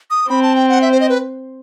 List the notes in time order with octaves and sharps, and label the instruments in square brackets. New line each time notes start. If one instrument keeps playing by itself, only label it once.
[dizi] D#6
[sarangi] C4 [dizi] B5
[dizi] A5
G5
F#5
E5
C5
D#5
B4